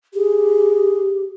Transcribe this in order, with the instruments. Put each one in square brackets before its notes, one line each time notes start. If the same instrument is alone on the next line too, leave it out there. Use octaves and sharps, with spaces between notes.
[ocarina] G4 [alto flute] G#4